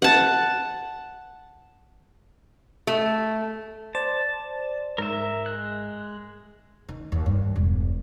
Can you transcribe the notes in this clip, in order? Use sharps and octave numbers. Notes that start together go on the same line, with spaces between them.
F#5 A5
A3
C5 D5 A5
G#2 A#4 E5
G#3 F#6
D#3
D#2
G2
E1